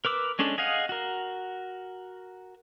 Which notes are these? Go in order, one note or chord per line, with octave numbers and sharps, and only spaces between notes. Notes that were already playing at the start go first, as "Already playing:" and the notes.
A#4 B4 D6 E6
G#3 C#4 D4 A4
G#4 D#5 F5 F#5
F#4 A#4